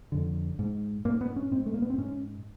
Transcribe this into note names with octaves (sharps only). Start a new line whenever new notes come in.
F2 D3
G#2
G#2 A#3
B3
C#4
G#2 C4
A3
A#3
B3
C4
G#2 C#4